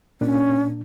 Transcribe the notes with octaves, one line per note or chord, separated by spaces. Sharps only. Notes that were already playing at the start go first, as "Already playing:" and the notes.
A#2 C#4 D4